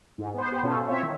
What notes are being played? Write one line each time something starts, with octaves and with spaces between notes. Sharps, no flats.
G#2
B3 C5
B3 G4 B4 C5
B2 C#4 F4 A4
C4 F4 C#5 E5
D#3